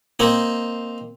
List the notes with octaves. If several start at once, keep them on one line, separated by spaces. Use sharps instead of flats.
A#3 C4 D#4